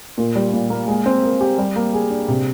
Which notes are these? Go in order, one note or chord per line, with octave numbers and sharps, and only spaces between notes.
A#2
G3
A#2
A#3
G#3
C4
A#4
G4
G3
A#3
G#4
D4
C3